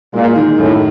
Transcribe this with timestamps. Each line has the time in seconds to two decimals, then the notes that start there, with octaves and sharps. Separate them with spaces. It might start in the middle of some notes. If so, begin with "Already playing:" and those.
0.13 A#2 G#3
0.35 D#3
0.58 F#2 A2